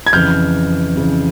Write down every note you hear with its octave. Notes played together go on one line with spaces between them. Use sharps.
G#6
F2 C#3 E3 F6 G6
F2 C#3 E3